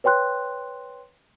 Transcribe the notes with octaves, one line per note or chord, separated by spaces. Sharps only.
B4 C#5 G5 C6 F#6